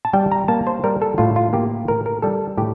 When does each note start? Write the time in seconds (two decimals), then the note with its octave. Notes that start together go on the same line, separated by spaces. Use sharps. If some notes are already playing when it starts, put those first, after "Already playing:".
0.05 A5
0.13 G3 G5
0.32 A#5
0.48 A#3 A5
0.67 C5
0.84 G3 A#4
1.02 A4
1.18 A2 F4
1.36 F4
1.53 A#3 G4
1.88 A2 A#4
2.06 A#4
2.22 G3 A4
2.57 A2 G4